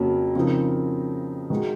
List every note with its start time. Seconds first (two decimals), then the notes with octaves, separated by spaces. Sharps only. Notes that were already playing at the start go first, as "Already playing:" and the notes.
Already playing: F2 C#3 F#3 A#3
0.35 C#3 F3 C4 D#4 A#4
1.50 D#3 G#3 D#4 F#4